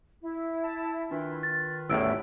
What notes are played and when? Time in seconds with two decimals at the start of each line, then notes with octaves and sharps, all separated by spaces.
0.22 E4
0.64 A5
1.11 D#3 D4 F4 B4
1.43 A6
1.90 A1 E2 A2 E4 E6 D7